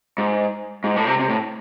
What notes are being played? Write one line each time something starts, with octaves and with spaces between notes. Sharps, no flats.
G#2
G#2
A2
C3
C3
A2